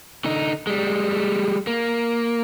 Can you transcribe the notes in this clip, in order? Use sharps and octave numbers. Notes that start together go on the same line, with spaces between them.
D3 D#4
G3 G#3
A#3